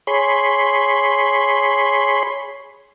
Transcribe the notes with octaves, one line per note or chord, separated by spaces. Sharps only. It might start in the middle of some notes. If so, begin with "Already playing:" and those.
G#4 C#5 B5 C6